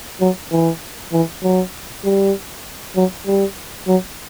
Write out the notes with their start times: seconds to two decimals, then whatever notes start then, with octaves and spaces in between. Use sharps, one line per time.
0.20 F#3
0.51 E3
1.13 E3
1.43 F#3
2.04 G3
2.96 F#3
3.26 G3
3.87 F#3